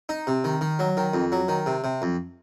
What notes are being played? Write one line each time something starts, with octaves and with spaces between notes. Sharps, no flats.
D#4
C3
D#3
D#3
F#3
D#3
F2
F#3
D#3
C3
C3
F2